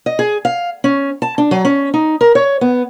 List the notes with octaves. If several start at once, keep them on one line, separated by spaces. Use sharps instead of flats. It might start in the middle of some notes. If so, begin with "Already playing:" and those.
D#5
G#4
F5
C#4
A5
D4
F#3
C#4
D#4
A#4
C#5
B3